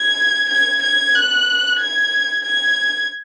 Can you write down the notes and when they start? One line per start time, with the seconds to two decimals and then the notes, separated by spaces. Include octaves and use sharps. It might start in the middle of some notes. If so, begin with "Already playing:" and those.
Already playing: G#6
0.49 G#6
0.82 G#6
1.15 F#6
1.79 G#6
2.44 G#6